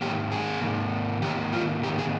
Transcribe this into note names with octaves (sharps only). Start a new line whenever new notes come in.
G#2 D#3 A#3 G4
G#4
G#2 D#3 A#3
G#2 D#3 A#3 G4
F4
G#2 D#3 A#3 G4
G#4